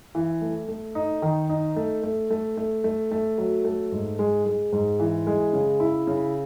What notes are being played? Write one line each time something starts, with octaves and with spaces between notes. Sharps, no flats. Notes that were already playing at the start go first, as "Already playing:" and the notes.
E3
A3
A3
D#4
D#3
D#4
A3
A3
A3
A3
A3
A3
F#3
A3
G#2
G#3
G#3
G#2
E3
G#3
C#3
E4
C#3